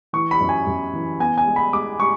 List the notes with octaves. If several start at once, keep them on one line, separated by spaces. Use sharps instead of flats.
E3 C#6
B5
F#2
G#5
F#2
E3
B3 G#5
G#5
G#3
B5
G#3 D6
G#3 C#6